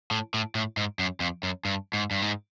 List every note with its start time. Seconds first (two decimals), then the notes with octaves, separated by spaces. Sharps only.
0.11 A2
0.34 A2
0.55 A2
0.77 G#2
0.99 F#2
1.20 F2
1.43 F#2
1.65 G2
1.93 G#2
2.11 G2
2.22 G#2